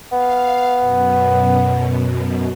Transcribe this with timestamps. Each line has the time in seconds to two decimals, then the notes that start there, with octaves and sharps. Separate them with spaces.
0.12 B3 F5
0.78 F#2 B2